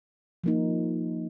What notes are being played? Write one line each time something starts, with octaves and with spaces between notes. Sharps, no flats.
F3 A#3 D#4